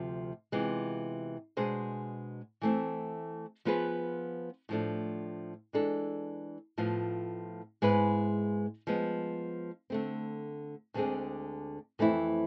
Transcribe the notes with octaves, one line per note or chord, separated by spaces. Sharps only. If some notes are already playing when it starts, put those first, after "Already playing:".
Already playing: D2 C3 F3
C3 E3 G#3 B3 F4
B2 G#3 D4 G#4 C5
E3 A3 C4
F3 B3 F4 G#4 B4
A2 F3 A3 D4
E3 G#3 D4 A4
A2 F3 B3 F4
G#2 G#3 B3 E4 B4
F3 G#3 B3
D3 A3 C4
D2 D3 G#3 C4 G#4
F2 E3 A3 C4 E4